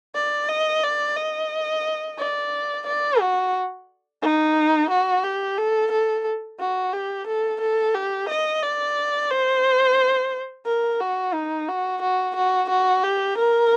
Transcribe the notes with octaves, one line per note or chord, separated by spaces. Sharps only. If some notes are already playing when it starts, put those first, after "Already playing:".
D5
D#5
D5
D#5
D5
D5
F#4
D#4
F#4
G4
A4
A4
F#4
G4
A4
A4
G4
D#5
D5
C5
A#4
F#4
D#4
F#4
F#4
F#4
F#4
G4
A#4